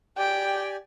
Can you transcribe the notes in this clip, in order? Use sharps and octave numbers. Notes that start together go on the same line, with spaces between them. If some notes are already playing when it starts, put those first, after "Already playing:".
G4 D5 G5 G#5